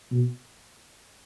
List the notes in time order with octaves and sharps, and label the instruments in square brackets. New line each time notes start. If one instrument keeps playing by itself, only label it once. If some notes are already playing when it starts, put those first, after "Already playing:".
[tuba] B2